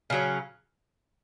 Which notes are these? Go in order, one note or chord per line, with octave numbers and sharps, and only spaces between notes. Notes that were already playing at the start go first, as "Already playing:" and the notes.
C#3 F#3 C#4